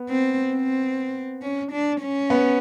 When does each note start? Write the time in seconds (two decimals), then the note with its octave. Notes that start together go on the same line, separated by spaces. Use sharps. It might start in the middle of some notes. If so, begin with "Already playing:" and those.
Already playing: B3
0.09 C4
0.53 C4
1.42 C#4
1.72 D4
2.01 C#4
2.30 B3